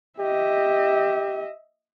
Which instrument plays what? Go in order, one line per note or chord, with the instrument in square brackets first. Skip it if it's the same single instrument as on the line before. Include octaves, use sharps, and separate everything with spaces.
[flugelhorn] G4 [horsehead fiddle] D#5 E5